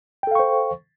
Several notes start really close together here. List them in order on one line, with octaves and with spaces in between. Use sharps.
G5 A4 F5 C#6 C5